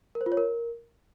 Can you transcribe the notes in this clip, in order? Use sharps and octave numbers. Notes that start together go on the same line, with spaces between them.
A#4
C5
F4
C#5
A#4